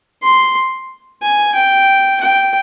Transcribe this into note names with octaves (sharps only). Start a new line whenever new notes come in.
C6
G#5
G5
G5